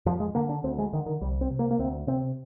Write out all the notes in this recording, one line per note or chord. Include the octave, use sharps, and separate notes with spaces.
F2 F3
G#3
D3 A#3
D4
D2 C4
G#3
D3 D#3
D#3
C2 G3
C4
C3
A#3
A#3
D2 C4
C3 C4